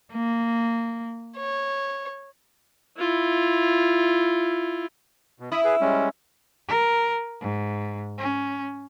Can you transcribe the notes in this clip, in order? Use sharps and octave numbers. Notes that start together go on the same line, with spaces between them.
A#3
C#5
E4 F4
B2
E4 B5 D#6
G#4 B4
G3 G#3 C#4
A#4
G#2
C#4